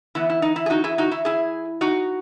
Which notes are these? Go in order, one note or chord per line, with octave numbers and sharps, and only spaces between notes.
E3 B3 E4
E4
D#4
E4
G#4
D#4 F#4
E4 G#4
D#4 F#4
E4
E4 G#4
D#4 F#4